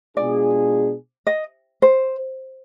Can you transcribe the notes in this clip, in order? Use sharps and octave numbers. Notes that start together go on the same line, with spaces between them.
B2 G#3 D4 F4 G#4 D5
D#5
C5